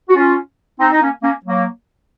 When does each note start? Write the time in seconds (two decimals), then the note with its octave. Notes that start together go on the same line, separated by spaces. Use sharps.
0.09 F#4
0.15 C#4 F4
0.80 C4 D#4
0.92 D#4
1.02 A#3 C#4
1.23 A#3 C#4
1.45 F#3 A#3